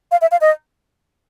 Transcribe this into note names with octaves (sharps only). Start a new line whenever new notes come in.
F5
E5
F5
D#5